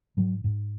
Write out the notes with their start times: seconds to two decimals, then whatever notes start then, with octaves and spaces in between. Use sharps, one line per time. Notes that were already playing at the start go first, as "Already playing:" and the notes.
0.17 G#2 F#3
0.44 G#2